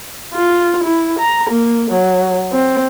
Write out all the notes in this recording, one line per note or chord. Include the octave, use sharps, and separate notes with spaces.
F4
E4
A#5
A#3
F#3
C4